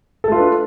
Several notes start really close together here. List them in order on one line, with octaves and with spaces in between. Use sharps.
A4 A3 F4 B4 D4